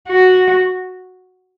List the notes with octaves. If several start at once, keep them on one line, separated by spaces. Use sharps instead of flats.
F#4